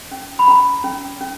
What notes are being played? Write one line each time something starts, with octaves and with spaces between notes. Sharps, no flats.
C#4
B5
C#4 A#5
C#4
C#4